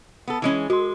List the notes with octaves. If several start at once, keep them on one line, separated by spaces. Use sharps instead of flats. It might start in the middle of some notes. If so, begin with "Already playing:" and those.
B3 A4
E3 G#3 C#4
G#3 F#4 C6